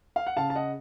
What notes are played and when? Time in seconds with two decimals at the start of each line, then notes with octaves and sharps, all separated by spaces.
0.16 F5
0.27 F#5
0.37 C#3 F5 A5
0.50 A5
0.55 D#5 F#5